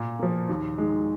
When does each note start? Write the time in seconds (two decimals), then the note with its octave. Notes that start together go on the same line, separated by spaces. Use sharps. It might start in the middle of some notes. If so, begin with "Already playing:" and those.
Already playing: A#2
0.19 F3 A#3
0.49 D#2
0.78 D#3 G#3